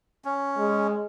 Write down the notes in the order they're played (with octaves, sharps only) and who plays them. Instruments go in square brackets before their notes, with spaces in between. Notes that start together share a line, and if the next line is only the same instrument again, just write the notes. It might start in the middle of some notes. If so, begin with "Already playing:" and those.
[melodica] C#4
[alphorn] G#3